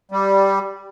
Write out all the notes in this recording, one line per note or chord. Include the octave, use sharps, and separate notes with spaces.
G3